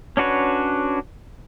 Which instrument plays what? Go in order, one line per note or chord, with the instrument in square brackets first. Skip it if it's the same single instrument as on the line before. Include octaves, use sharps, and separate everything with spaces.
[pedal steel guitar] C#4 D4 F#4 B4 C#5